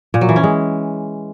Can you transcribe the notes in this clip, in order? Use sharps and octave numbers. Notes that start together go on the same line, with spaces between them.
A#2
F#3
E3
C#4
G#3